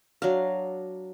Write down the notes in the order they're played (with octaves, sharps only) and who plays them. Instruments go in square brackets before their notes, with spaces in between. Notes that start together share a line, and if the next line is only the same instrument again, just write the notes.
[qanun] F#3 D4 F5